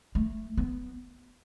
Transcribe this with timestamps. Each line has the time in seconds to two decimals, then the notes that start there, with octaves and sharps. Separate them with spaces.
0.15 A3
0.57 B3